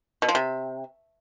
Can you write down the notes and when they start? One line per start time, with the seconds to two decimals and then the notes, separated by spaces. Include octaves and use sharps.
0.22 B2
0.29 F3
0.35 C3